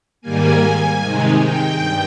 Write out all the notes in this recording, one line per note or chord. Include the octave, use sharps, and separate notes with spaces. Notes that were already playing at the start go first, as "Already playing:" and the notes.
G#2 D#3 G3 A#3 G#5
C3 D#3 G#3 D#4
G5
G2